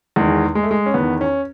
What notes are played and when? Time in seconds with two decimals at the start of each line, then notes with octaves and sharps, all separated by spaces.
0.16 E2 D#3 G#3
0.55 G#3
0.63 A3
0.71 G#3
0.86 C#4
0.94 E2 D#3 B3
1.21 C#4